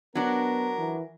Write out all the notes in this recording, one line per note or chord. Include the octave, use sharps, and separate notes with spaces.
F#3 B3 D4 A#4
E3